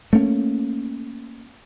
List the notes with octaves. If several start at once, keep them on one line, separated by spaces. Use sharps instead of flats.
A3 A#3 C#4